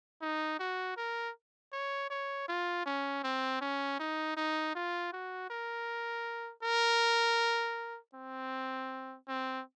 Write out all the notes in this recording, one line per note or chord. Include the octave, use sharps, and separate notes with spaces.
D#4
F#4
A#4
C#5
C#5
F4
C#4
C4
C#4
D#4
D#4
F4
F#4
A#4
A#4
C4
C4